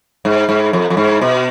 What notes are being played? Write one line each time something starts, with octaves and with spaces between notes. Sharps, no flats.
G#2
G#2
F2
F2
G#2
B2